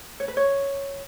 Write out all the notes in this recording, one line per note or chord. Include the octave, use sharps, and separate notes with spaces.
C#5
B4
C#5